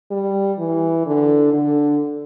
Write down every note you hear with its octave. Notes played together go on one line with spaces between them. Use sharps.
G3
E3
D3
D3